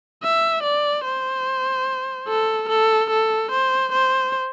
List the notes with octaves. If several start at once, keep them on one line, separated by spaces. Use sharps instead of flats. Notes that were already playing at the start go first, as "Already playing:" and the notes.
E5
D5
C5
A4
A4
A4
C5
C5